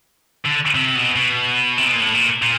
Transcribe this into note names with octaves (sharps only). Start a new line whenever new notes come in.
D3
C3
B2
B2
C3
B2
A#2
A2
A#2
A#2